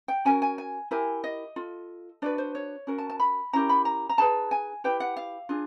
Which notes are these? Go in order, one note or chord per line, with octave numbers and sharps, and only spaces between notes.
G5
C#4 F#4 A#4 G#5
G#5
G#5
E4 G4 A#4 G#5
D#5
F4 A4
D4 F#4 B4 D5
C5
C#5
C#4 F#4 A#4
A5
A5
B5
C#4 E4 G4 A#4 A#5
B5
A#5
A#5
D#4 G#4 B4 A5
G#5
E4 G4 B4 G5
F#5
F5
D4 F4 G#4